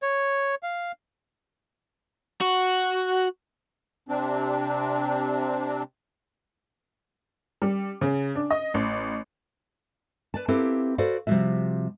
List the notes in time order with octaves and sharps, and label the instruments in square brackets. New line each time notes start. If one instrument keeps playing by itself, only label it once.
[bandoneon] C#5
F5
[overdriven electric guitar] F#4
[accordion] C3 C4 D4
[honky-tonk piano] G3
C#3
D4
D#5
A1
[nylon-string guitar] B4 D5 A5
A#3 C4 E4 G4 A4 B4
F#4 A4 B4 C5 D5 F5
C3 F3 G3 G#3 F#4 E5